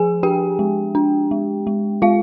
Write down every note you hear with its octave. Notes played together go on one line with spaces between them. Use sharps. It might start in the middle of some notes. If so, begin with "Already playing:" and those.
Already playing: F3 G#4 G#5
D4 G4 G5
G#3
D4
G#3
G#3
G#3 F4 F5